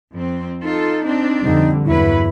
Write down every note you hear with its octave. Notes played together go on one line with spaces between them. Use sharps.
F2 C4
D#4 F4 A4
C4 D4
F2 D3 G3 D#4
E2 G2 F#3 E4 B4